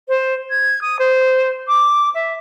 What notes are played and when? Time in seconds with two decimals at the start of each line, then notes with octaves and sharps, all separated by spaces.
0.08 C5
0.49 G#6
0.81 D#6
0.99 C5
1.67 D6
2.14 E5